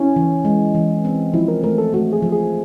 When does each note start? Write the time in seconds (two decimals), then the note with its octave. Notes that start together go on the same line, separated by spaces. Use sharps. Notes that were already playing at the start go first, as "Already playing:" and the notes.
Already playing: C#4 E4
0.16 E3
0.45 G#3
0.75 E3
1.05 C4
1.34 F3 E4
1.48 A#4
1.64 A3 A#4
1.78 A4
1.94 A3 F#4
2.13 G#4
2.22 F3
2.32 G#4